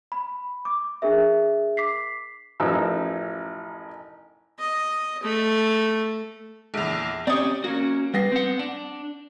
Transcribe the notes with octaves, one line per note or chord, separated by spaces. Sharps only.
B5
D6
D4 G#4 A#4 E5
D6 B6 C7
A1 F#2 F3 D#4 E6
D#5
A3
A#1 E2
C4 C#4 G4 D5 D#6
A#3 C#4 F#4
G3 B3 A#6 C7
C4 F#5
D4 E7